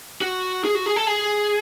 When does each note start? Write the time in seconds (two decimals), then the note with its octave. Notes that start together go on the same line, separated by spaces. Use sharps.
0.21 F#4
0.65 G#4
0.75 F#4
0.86 G#4
0.96 A4
1.07 G#4